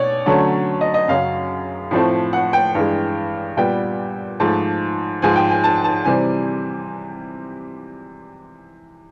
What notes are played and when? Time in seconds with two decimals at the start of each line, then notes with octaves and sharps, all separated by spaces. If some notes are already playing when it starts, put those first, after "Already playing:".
Already playing: B2 C#5 D5
0.26 D3 F#3 A3 C#4
0.81 D#5
0.94 D#5
1.08 F#2 C#3 F#3 F5
1.91 A2 F3 A3 C4
2.33 F#5
2.53 G5
2.75 G2 E3 G#3
3.57 A#2 G3 B3 G5
4.40 G#2 F3 A3 A5
5.22 G#2 F3 G#3 G#5
5.36 G5
5.50 G#5
5.64 A5
5.84 A5
6.05 C3 E3 G3 C4 G#5